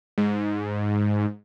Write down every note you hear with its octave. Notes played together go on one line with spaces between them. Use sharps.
G#2